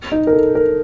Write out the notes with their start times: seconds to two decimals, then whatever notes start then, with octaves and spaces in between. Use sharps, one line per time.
0.12 D#4
0.27 A#4
0.33 A4
0.55 A#4